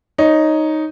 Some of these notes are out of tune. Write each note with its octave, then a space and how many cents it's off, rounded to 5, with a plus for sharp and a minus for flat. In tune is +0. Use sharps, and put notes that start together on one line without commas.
D#4 +0 C#5 +0